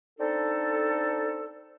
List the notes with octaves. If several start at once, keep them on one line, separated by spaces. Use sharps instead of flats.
C4 D4 D#4 A4